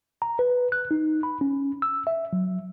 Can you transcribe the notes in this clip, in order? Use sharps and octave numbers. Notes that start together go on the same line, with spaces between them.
A#5
B4
F#6
D#4
B5
C#4
E6
E5
F#3